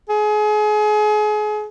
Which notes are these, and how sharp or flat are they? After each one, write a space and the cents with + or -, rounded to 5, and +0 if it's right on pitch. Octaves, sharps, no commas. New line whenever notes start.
G#4 +30